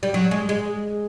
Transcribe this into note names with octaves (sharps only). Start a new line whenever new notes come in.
G3
F#3
G#3
G#3